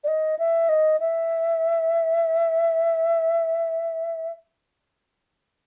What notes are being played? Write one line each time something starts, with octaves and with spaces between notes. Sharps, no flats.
D5
D#5
E5
D#5
E5